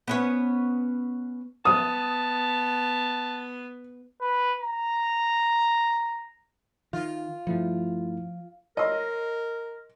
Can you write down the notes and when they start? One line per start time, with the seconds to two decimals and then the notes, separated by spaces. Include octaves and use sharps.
0.08 B3 C#4 C#5
1.65 B3 A5 D#6
4.21 B4
4.61 A#5
6.93 D#3 F4
7.47 G2 F3 A3 E4
8.77 A#4 C#5 D#5 C6 E6